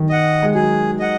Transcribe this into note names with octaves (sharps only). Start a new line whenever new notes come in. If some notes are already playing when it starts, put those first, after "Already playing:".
Already playing: D#3
D#5 F#5
G#3
F#3 G#4
D#5 F#5